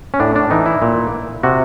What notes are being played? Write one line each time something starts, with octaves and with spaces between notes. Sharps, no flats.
C#4
A2 D4
D4
E3 D#4
E4
A#2
C3 F#4